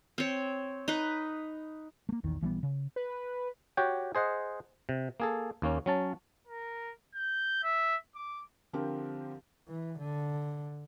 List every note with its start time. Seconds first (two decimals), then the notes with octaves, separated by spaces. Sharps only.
0.18 C4 C#5
0.88 D#4 B4
2.09 A3 A#3
2.23 A#1 E2 D#3
2.41 A#1 E3 G3 B3
2.63 C#3
2.96 B4
3.77 F#4 G4 C#5 G5
4.15 G#4 C5 D#5 F#5
4.89 C3
5.20 A#3 G#4 A4
5.62 D#2 A#3 C#4
5.86 F#3 C#4 A5
6.47 A#4
7.15 G6
7.63 E5
8.15 D6
8.73 D3 F3 C4 G4 A#4
9.68 E3
9.99 D3